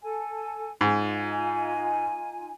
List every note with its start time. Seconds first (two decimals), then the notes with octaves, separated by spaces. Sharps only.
0.03 A4 G#5
0.81 G#2 D#4 F4 G#5